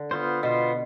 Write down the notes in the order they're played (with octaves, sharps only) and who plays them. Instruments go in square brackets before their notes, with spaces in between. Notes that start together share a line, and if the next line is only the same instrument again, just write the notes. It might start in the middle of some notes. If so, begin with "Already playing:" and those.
Already playing: [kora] D3
[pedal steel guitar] B3 F4 C5
[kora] B2 [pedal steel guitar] B3 F4 C5